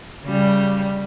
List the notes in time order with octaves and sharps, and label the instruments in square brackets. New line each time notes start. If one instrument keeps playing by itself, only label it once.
[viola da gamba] C#3 G3